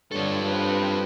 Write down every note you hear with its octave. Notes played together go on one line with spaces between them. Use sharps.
G2 D3 F4 A4 C#5
C4 B4